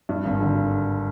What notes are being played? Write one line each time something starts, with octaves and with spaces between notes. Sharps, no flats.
G2
G#1
D3